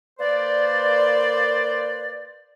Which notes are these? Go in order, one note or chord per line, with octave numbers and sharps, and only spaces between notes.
A#3 B4 C5 D5